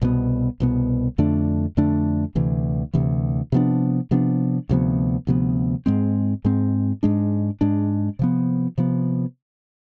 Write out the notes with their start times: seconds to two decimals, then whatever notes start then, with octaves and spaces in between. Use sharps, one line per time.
0.02 C2 B2 B3
0.60 C2 B2 B3
1.18 F2 D3 A3 D4
1.77 F2 D3 A3 D4
2.35 D2 C3 E3
2.94 D2 C3 E3
3.52 C3 F3 B3 D4
4.11 C3 F3 B3 D4
4.69 D2 C3 F3 B3
5.27 D2 C3 F3 B3
5.86 G#2 G#3 C4
6.45 G#2 G#3 C4
7.03 G#2 G#3 D4
7.61 G#2 G#3 D4
8.19 C3 F3 B3
8.78 C3 F3 B3